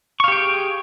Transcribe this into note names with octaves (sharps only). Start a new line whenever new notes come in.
G4 G#4 F5 G5 C#6